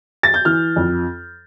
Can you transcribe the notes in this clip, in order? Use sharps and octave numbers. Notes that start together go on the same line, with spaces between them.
A6
G6
E3 F6
F2